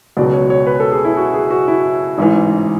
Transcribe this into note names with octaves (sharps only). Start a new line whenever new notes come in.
C#2 B2 F#3 D5
C#5
C#5
B4
A4
G#4
E4
F#4
G#4
F#4
E4
A1 G#2 E3